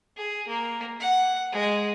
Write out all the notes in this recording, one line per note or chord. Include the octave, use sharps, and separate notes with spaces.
G#4
A#3
F#5
G#3